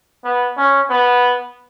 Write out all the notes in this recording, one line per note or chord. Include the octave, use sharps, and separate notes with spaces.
B3
C#4
B3